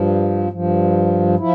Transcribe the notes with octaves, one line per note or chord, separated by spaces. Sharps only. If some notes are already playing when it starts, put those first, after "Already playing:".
Already playing: G2 F3
G2 F3
F3 E4